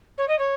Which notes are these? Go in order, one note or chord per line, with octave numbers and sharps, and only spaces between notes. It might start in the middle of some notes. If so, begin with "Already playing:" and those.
C#5
D#5
C#5